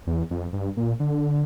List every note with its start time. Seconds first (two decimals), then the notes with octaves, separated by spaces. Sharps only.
0.07 E2
0.31 F2
0.53 G2
0.77 A#2
1.00 D3